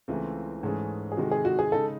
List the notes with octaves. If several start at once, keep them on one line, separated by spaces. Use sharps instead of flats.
C#2 C#3 E3 A3 C4 E4
G#2 E3 A3 C#4 G#4
G#4
C3 D#3 G#3 D#4 F#4 A4
G#4
F#4
G#4
C#3 G#3 D#4 A4